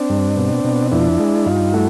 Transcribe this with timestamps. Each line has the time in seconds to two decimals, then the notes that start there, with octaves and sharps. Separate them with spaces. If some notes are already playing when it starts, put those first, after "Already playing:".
Already playing: C4 D4
0.10 G2
0.37 B2
0.64 B2
0.91 F2 D4 E4
1.19 G#3
1.46 G2 D#4 F4
1.73 A3 E4 F#4